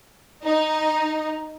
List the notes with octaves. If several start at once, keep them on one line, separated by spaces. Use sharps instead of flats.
D#4